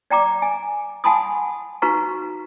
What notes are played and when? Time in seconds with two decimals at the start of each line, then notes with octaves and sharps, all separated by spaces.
0.10 D5 G5 A#5 D6
0.42 G#5
1.04 F#5 G#5 A5 B5 C6 D#6
1.82 D#4 F#4 B4 F5 A#5 C#6